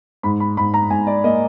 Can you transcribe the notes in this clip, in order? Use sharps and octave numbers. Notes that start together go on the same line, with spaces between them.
G#2 B5
B5
G#2 B5
A#5
G#2 G#5
D5
A#3 D#5